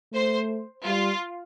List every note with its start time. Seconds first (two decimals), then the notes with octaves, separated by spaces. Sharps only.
0.13 A3 C5
0.85 G3 F4